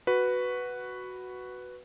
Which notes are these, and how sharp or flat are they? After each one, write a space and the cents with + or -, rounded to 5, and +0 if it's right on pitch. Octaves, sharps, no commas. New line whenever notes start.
F#4 +0 B4 +0